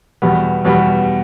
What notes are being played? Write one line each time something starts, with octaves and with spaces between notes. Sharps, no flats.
E2 B2 G3 B3
E2 B2 G3 B3